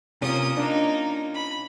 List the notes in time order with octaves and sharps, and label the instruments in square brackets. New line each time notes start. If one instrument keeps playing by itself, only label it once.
[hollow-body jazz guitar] C3 [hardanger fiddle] A#3 D#6 [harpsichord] C#4 F4
[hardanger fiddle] A#3 D#4 [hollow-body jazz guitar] D4
[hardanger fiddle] B5